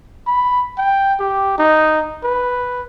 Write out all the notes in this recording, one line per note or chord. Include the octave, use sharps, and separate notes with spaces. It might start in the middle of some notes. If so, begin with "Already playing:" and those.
B5
G5
G4
D#4
B4